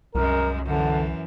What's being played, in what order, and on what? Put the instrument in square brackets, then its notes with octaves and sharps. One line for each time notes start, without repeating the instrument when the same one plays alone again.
[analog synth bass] C2 [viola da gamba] F#2 G#3 [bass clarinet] A#4
[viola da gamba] F#2 E3 [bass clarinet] D3